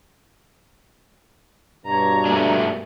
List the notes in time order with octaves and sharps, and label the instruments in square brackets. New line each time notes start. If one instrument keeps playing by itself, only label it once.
[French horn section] G2 B2 [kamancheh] C#5 A#5
[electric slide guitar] A3 A#3 D4